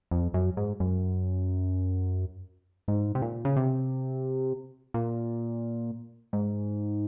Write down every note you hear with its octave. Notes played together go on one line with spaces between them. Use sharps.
F2
F#2
G#2
F#2
G#2
C3
A#2
C#3
C3
A#2
G#2